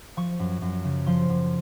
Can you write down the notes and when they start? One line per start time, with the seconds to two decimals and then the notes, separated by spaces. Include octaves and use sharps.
0.17 F3 C#6
0.39 F#2
0.62 F#2
0.84 C#3
1.06 F3 C6
1.29 F#2